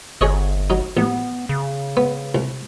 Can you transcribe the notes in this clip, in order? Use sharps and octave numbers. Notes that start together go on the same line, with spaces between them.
G1 G#4 C#5 D#5
F#3 D#4
A1 B3
C#3
B3
C2